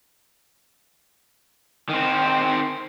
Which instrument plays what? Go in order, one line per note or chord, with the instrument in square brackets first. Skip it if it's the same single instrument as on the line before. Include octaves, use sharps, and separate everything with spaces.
[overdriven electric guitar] D#3 C4